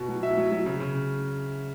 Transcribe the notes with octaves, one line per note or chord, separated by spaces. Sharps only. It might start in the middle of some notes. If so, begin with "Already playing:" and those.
Already playing: B2
F#3
B2 E5
F#3
F#3
C#3
C#3